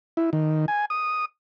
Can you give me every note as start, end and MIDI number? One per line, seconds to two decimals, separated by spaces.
0.17 0.30 64
0.33 0.66 51
0.68 0.85 80
0.90 1.25 87